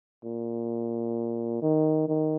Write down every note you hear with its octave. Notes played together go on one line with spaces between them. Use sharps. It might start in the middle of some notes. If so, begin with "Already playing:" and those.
A#2
D#3
D#3